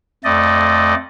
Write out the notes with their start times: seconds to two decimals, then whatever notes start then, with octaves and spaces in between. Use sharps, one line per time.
0.24 F2 A3 D5 D#5